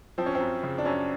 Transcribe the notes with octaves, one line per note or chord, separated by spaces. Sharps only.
F3 C4
C#4
C4
F#2
C#3
D4
F#2 C#4